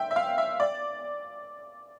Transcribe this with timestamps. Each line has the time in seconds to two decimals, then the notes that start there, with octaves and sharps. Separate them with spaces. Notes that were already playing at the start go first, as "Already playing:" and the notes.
Already playing: E5 G5
0.11 E5
0.16 F5
0.38 E5
0.60 D5